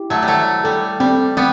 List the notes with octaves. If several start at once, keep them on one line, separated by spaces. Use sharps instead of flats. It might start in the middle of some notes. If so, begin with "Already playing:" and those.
Already playing: E4 G4
F#3 A3
G3
F#3 A3 C5
G3 A4
G3 C4
G3 B3 C4